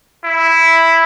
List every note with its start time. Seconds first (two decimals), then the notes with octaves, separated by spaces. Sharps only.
0.24 E4